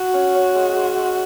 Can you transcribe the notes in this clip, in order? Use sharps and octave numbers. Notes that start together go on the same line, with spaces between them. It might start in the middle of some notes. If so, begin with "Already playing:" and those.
Already playing: F#4
C#4
C#4
G#3
G#3
G#3